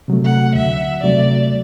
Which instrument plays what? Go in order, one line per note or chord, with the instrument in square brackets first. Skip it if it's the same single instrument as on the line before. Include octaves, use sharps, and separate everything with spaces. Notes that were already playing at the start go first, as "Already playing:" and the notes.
[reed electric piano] C3 F#3 A3
[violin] F#5
[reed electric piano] D2 [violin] E5
[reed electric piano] C3 F#3 A3 [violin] D5